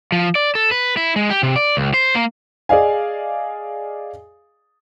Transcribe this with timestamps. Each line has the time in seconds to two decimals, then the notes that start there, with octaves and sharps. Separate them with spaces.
0.12 F3
0.35 D5
0.55 A4
0.71 B4
0.97 E4
1.16 G#3
1.30 G4
1.43 C3
1.56 D5
1.77 C#2
1.94 C5
2.15 A#3
2.69 G#4 D5 D#5 F5 G#5